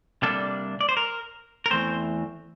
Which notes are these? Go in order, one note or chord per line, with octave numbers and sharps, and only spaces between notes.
C3 G3 A#3 D4 A4
D5
C5
A#4
A#4
E2 E3 A3 C4 C5